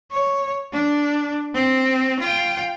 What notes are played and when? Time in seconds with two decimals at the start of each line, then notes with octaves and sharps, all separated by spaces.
0.11 C#5
0.73 D4
1.54 C4
2.20 F4 G5